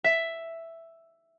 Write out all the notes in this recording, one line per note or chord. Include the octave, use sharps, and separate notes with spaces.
E5